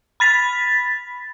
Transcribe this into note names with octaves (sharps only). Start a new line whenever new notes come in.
B5 A6 B6